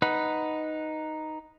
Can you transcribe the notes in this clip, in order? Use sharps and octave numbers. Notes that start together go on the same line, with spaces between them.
D#4 B4 F#5